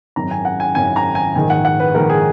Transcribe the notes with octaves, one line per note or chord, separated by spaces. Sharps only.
G#1 F#2 D#3 A#5
G#5
F#5
G#5
G#1 F#2 D#3 G#5
A#5
G#5
A#1 G#2 D#3 G#5
F#5
F#5
B4
A#1 G#2 D#3 A#4
G#4